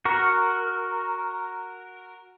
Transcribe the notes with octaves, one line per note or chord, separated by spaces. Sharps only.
F#4 A#4